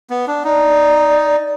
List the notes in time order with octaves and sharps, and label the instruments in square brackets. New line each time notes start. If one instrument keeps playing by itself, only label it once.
[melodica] B3
D4
[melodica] D#4 [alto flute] D5